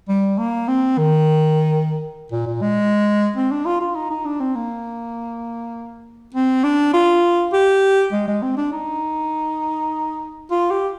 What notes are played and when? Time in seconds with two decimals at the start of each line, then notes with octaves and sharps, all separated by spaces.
0.09 G3
0.38 A#3
0.68 C4
0.98 D#3
2.32 A#2
2.47 A#2
2.62 G#3
3.36 C4
3.51 D4
3.66 F4
3.81 F4
3.95 D#4
4.11 D#4
4.26 D4
4.40 C4
4.55 A#3
6.34 C4
6.64 D4
6.94 F4
7.53 G4
8.13 G#3
8.28 G#3
8.43 C4
8.57 D4
8.73 D#4
10.51 F4
10.71 G4